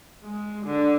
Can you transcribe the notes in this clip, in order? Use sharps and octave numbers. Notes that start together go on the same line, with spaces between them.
G#3
D3